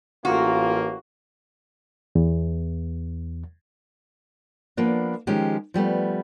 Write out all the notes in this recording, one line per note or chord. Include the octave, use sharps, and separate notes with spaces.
A1 A#3 F4 F#4
E2
F3 A#3 B3 D4
D#3 F3 G#3 C#4 G4
F3 G3 A3 B3